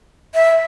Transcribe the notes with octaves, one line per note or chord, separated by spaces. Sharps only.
E5